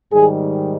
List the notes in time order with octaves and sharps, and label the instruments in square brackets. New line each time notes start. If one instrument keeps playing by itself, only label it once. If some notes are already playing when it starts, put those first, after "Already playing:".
[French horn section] G#2 D#3 G3 G#4